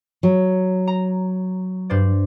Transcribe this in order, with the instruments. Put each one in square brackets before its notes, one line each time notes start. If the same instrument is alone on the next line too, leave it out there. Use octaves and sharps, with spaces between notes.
[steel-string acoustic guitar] F#3
[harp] A#5
G2 C5 D5